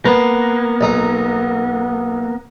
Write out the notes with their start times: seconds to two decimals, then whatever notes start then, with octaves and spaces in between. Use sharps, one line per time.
0.05 A#3 B3 B4
0.81 B1 D#4